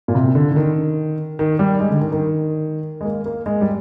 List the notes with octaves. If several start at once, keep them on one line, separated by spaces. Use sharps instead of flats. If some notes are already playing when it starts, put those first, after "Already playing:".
A#2
C3
D3
D3
D#3
D#3
G3
G#3
D3
D#3
D#3
G#3
A#3
A#3
G#3
G3